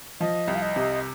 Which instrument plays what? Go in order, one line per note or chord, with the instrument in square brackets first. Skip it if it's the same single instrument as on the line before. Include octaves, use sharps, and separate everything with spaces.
[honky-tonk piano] F3 [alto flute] D#5
[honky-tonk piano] C2
[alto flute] F5
D#5
[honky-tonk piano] C3